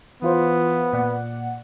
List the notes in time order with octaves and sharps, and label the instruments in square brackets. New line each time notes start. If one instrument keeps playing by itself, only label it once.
[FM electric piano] E3 F4 C5 [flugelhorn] B3
[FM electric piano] A#2 D5 F#5